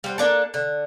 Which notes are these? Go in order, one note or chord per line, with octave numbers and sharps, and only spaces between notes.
G3 C5 F#5
A#3 D4 A4
D3